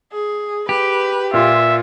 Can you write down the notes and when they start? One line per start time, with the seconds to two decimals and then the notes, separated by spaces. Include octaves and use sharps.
0.12 G#4
0.69 G4 B4
1.34 A#2 F4 E5